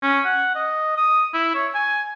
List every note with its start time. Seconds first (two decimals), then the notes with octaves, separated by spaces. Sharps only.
0.02 C#4
0.25 F#5
0.56 D#5
0.97 D#6
1.34 E4
1.55 C#5
1.74 G#5